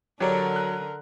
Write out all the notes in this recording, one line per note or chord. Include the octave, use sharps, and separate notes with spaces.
D3 F#3 G4 A#4 C#5 D5
F#6